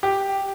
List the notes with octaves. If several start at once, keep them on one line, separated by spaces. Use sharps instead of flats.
G4